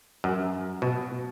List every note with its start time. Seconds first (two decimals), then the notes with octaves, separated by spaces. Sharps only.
0.24 F#2
0.82 B2